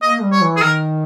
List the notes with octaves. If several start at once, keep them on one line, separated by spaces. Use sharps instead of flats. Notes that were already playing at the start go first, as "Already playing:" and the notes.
A#3 D#5
G3
C#5
E3
G#4
D#3 A#4